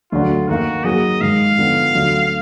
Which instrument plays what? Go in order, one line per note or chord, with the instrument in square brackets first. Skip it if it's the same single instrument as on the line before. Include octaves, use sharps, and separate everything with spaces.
[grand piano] D2 D3 F#3 D4 F#4 [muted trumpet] F4
[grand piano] D#3 A#3 D#4 A#4 F5 [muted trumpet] F#4
[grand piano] F#3 A#3 D#4 G#4 [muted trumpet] D#5
[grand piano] G#2 D#3 G#3 [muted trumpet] F5
[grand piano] D3 F3 B3 D#4
D2 D3 F#3